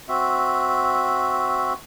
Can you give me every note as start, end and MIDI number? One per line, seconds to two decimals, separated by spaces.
0.09 1.73 60
0.09 1.73 66
0.09 1.73 76